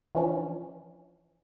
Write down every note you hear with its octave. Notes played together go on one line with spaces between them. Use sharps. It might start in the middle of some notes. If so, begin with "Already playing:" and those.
E3 F3 C#4 D4